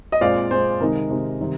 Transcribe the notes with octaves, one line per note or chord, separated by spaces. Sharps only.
D#5
A#2 G#3 C4 D5 F5
A#2 G#3 C4 C5
C3 D#3 G#3 D#4 A#4
C3 D#3 G#3 D#4
C3 D#3 G3